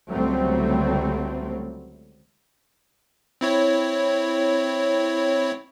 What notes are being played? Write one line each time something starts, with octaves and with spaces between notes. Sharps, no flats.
C#2 D3 F#3 G3 A3 C4
C4 E4 C#5